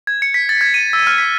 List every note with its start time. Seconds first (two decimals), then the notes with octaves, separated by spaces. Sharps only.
0.07 G#6
0.22 C#7
0.34 B6
0.49 A6
0.61 G#6
0.74 D#7
0.93 E6
1.07 F6
1.18 B6